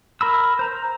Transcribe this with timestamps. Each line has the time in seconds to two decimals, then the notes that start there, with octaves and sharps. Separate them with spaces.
0.21 A#4 B5 E6
0.59 C5 A#5